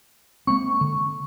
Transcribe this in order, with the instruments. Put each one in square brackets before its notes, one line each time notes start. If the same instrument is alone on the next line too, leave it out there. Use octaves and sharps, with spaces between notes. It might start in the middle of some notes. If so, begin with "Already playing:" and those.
[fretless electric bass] G#3 A#3 C4 [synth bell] C#6
[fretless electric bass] D3